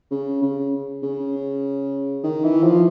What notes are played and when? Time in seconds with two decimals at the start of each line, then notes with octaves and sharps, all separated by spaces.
0.11 C#3
0.42 C#3
1.03 C#3
2.24 D#3
2.44 E3
2.64 F3